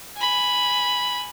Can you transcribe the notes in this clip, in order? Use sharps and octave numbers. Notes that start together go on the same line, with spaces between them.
G#5 B5